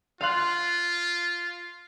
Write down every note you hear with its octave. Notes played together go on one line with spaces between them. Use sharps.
F4 F5 C6 F#6